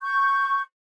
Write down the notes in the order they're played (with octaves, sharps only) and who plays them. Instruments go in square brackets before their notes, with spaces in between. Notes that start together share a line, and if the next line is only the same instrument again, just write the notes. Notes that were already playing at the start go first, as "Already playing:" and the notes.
[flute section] C#6 G6